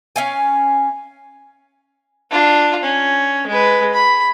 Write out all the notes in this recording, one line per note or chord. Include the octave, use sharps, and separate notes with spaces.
C#4 F5 G#5
D4 F4
C#4
G#3 B4
B5